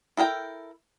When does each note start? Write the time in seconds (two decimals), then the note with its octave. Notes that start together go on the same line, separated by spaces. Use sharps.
0.17 E4 A4 A#4 G5